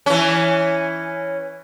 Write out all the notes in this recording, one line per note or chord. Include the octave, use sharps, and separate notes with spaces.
E3 C#4